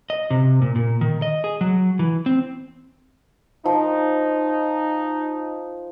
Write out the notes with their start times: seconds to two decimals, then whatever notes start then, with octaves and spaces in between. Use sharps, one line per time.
0.10 D#5
0.30 C3
0.62 A#2
0.76 A#2
1.01 D#3
1.22 D#5
1.44 G#4
1.61 F#3
1.99 E3
2.26 C4
3.65 F3 D#4